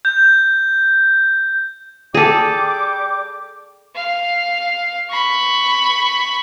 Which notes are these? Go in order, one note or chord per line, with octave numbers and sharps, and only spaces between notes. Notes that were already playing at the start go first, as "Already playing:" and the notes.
G6
G3 G#4 A4 G5 D6
F5
B5 C#6